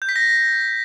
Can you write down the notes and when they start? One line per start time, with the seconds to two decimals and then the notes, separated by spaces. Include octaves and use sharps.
0.02 G6
0.09 B6
0.16 A#6